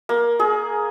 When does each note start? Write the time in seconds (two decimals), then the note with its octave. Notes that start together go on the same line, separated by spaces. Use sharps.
0.09 A#3
0.39 G#4